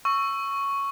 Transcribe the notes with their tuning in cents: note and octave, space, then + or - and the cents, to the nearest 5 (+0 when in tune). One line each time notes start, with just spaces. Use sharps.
C#6 +0 E6 +15